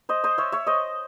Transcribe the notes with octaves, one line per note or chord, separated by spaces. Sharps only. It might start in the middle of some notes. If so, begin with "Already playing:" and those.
C5 D#5
C5 D#5
C#5 E5
C#5 E5
C5 D#5